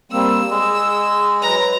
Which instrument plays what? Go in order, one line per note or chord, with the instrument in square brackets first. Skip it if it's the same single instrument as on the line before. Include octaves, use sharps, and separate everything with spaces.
[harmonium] G3 A#3 C4 [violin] E6
[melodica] G#3 [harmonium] G#4
[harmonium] F#3 B4 [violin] A#5